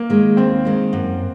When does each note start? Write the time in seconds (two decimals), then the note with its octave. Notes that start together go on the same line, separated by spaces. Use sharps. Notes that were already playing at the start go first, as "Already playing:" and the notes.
Already playing: A#3
0.10 D#3 G#3
0.37 D#2 C4
0.65 D#3 G#3
0.93 F#2